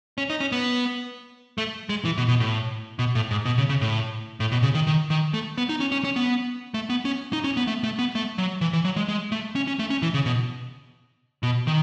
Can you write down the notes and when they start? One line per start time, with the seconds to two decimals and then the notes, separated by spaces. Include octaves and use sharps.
0.18 C#4
0.30 D#4
0.40 C#4
0.52 B3
1.58 A3
1.89 G#3
2.05 E3
2.18 B2
2.28 B2
2.40 A2
2.99 B2
3.15 A2
3.31 G#2
3.45 B2
3.58 C#3
3.69 C#3
3.81 A2
4.40 A2
4.52 B2
4.63 C#3
4.74 D#3
4.87 D#3
5.10 D#3
5.34 A3
5.58 B3
5.69 D#4
5.80 C#4
5.92 C#4
6.04 C#4
6.16 B3
6.74 A3
6.90 B3
7.05 C#4
7.33 D#4
7.44 C#4
7.57 B3
7.67 A3
7.84 A3
7.99 B3
8.15 A3
8.38 F#3
8.61 E3
8.73 E3
8.85 F#3
8.96 G#3
9.08 G#3
9.32 A3
9.55 C#4
9.67 C#4
9.79 A3
9.90 C#4
10.02 E3
10.14 C#3
10.26 B2
11.43 B2
11.67 D#3